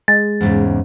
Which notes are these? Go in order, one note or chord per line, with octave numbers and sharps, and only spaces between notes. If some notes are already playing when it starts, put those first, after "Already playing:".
G#3 A6
E2 G#2 C#3